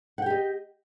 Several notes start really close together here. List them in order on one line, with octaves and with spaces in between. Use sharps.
F#5 G5 G4 D#5